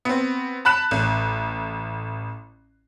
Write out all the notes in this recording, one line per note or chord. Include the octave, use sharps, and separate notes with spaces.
B3 C4
A5 B5 F#6 E7
A1